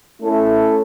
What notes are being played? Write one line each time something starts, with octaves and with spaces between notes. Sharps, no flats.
A3 C#4 E4 A4